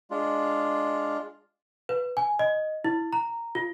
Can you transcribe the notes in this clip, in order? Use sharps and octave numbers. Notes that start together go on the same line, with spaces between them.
G#3 D4 F4
B4
G#5
D#5
E4
A#5
F4